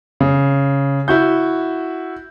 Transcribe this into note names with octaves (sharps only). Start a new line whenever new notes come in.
C#3
E4 F#4 G6